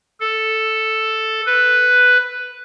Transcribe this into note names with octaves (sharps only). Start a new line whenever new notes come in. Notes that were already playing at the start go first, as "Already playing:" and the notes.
A4
B4